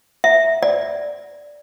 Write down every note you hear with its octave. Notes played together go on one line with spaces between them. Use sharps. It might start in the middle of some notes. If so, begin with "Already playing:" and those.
E5
D5